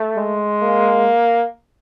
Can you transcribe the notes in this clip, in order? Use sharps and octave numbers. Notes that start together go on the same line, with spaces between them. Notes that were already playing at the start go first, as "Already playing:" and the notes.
Already playing: A3
G#3
A#3